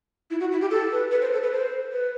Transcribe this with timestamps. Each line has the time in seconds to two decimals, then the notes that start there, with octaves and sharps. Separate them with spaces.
0.31 E4
0.40 F#4
0.52 E4
0.61 G4
0.71 A4
0.92 B4
1.11 B4
1.21 C5
1.33 A4
1.43 B4
1.53 C5
1.93 B4